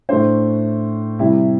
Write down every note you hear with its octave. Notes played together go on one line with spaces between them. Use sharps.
A2 A3 D4 C5
C3 G3 E4